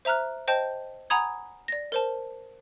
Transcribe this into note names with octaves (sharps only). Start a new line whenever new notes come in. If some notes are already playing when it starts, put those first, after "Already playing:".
C5 E5 A#5 F6 F#6
C5 D#5 G5 A5 G6
F#5 G#5 A#5 B5 D#6 G#6
D5 A#6
A#4 C5 A5